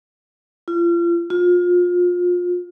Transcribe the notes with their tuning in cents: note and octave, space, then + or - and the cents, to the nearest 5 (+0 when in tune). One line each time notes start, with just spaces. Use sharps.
F4 -35
F4 +30